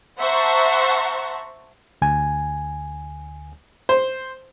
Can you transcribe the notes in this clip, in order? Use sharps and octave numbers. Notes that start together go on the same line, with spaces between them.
C5 E5 F#5 A5 A#5 C#6
D2 G#5
C5